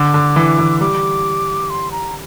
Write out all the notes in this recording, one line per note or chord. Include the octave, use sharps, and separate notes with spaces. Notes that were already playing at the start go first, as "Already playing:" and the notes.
Already playing: D3 D6
D3
E3
E3
G3 D6
C6
A#5